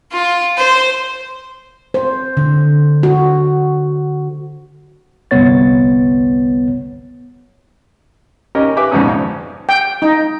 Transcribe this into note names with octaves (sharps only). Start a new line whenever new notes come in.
F4
C5
C5
D3
F#4
G1 C2 B3 C#5 A6
C#4 G4 A#4 D#5
G4 B4 E5 G#5 D6
A#1 F2 G#2 B2 C#4 D#6
G5
D#4